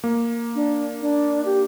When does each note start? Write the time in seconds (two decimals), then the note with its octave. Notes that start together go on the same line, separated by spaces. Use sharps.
0.04 A#3
0.55 D4
1.01 D4
1.45 G4